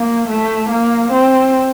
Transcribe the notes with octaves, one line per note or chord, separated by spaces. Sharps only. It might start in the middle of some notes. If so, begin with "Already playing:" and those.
Already playing: A#3
A3
A#3
C4